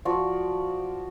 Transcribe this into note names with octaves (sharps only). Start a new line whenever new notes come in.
F3 F#4 D5